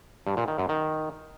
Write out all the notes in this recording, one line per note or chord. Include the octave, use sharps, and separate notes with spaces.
G2
A#2
D#3
F#2
D#3